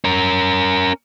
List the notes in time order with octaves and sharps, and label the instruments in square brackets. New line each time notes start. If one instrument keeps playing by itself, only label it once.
[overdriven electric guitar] C#4 A#4